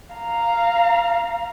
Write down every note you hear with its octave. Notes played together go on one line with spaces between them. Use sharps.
F5 A#5